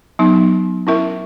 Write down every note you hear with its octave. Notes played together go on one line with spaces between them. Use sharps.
F#3 B3 D#4
C#4 E4 A#4 E5